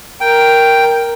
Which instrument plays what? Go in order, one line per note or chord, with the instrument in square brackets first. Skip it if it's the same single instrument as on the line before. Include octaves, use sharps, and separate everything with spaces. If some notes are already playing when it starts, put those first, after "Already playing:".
[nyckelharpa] A#4 [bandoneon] G5